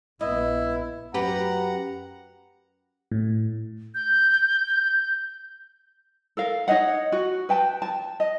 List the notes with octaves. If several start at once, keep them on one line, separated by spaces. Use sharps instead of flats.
A#1 B3 E4 D#5
F#2 G4 B4 F#5 A#5
A2
G6
A4 A#4 F5
D#4 C#5 D#5 F#5
F#4
B4 G5 A5
A5
D#5